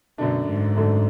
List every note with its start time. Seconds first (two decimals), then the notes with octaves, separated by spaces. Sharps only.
0.18 F#2 B2 D3 A3 D4
0.47 G#2
0.76 F#2 D3 A3 D4